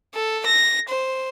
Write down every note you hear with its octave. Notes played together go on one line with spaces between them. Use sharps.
A4
A#6
C5